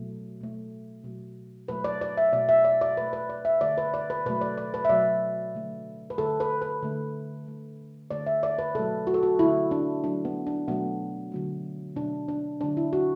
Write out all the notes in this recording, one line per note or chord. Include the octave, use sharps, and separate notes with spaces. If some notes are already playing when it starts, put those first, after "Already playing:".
Already playing: B2 F#3 A3
B2 A3
B2 F#3 A3
B2 F#3 A3 B4
D5
D5
E5
B2 A3 D5
E5
D5
D5
B2 A3 B4
B4
D5
E5
D3 A3 D5
B4
D5
B4
B2 F#3 A3 B4
D5
D5
B4
E5
B2 F#3 A3 D5
D3 F#3 A3
B4
D3 A3 A4
B4
B4
D3 A3
D3 A3
D3 A3 D5
E5
D5
B4
B2 F#3 A3 A4
F#4
A4
F#4
D3 F#3 A3 E4
D4
D3 F#3 A3 D4
B3
D4
B2 F#3 A3 B3
D3 F#3 A3
B2 F#3 A3 D4
D4
D3 F#3 A3 D4
E4
F#4